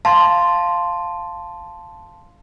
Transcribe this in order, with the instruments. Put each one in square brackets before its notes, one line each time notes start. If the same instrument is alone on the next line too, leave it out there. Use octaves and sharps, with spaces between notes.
[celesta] F5 C6 [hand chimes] A5